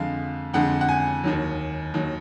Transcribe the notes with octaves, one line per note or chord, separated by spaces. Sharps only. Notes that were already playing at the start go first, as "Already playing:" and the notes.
Already playing: F2 D3 G#3 F5
F2 D3 G#3 F#5
F#5
G#5
D#2 D#3 F#3
D#2 D#3 F#3